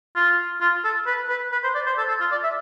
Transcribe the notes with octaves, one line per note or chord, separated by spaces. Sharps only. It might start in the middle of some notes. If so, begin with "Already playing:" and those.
F4
F4
A4
B4
B4
B4
C5
D5
C5
A4
A4
F4
D5
E5